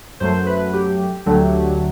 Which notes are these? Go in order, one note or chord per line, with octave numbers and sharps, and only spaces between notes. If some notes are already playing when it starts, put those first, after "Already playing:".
F#2 F#3 A3 C5
B4
G4
D2 D3 F#3 A3